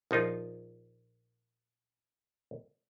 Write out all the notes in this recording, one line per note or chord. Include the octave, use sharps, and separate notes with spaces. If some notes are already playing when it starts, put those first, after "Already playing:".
A#1 F3 D#4 F4